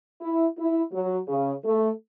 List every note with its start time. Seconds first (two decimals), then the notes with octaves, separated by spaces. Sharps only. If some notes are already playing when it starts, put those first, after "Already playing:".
0.21 E4
0.57 E4
0.93 F#3
1.28 C#3
1.64 A3